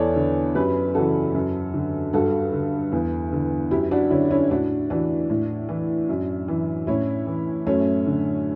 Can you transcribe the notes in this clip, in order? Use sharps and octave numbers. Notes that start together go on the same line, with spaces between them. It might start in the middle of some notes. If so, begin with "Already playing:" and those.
Already playing: E2 A4 C#5 D5
D3
F#2 G4 B4
C#3 E3 F#4 A4
F#2
D3
G2 F#4 A4
D3
E2
D3
F#2 E4 G4
D4 F#4
D3 C#4 E4
C#4 E4
A2 D4 F#4
E3 D4 F#4
A2
E3
F#2
E3
A2 C#4 E4
E3
F#2 A3 C#4
D3